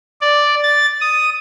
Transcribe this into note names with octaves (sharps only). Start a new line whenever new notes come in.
D5
A6
D#6